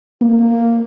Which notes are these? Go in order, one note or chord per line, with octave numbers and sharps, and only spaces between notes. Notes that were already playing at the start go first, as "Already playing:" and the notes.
A#3